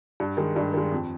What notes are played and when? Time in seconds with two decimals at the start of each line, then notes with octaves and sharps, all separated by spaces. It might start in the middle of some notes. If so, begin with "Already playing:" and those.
0.20 G2
0.37 D#3 G#3
0.56 G2
0.73 D#3 G#3
0.92 F2